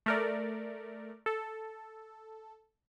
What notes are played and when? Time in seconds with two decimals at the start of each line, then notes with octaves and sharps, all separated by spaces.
0.06 A3 A#4 D5
1.26 A4